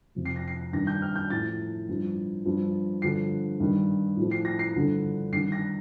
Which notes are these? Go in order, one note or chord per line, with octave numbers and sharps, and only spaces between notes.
F2 C3 F3
C7
A#6
C7
G2 D#3 A#6
G6
F6
G6
A2 F3 A6
G2 F3
G2 F3
G2 D3 F3 C7
G2 D#3
A2 F3
C7
A#6
C7
G2 D3 F3
G2 D#3 C7
A#6